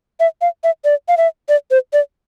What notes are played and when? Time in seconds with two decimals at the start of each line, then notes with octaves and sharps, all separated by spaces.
0.20 E5
0.41 F5
0.64 E5
0.85 D5
1.08 F5
1.17 E5
1.49 D5
1.71 C5
1.93 D5